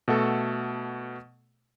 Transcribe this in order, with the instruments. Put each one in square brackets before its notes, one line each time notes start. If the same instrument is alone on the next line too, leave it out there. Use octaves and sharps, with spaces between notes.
[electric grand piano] B2 A3 F#4 A4